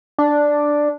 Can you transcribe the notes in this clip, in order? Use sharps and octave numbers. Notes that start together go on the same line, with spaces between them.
D4